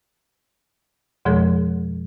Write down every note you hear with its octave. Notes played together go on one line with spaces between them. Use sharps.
F2 B2 F3 G#3 G#4 C#5